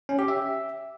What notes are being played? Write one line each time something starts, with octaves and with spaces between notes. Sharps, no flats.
C#4
G4
E5